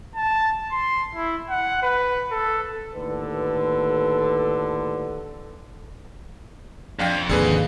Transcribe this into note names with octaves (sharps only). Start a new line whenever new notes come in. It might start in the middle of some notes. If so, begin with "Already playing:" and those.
A5
C6
E4
F#5
B4
A4
D#2 A2 D3 A4 B4
F2 D4 F5 G5
G#1 D#2 D3 G#4 B4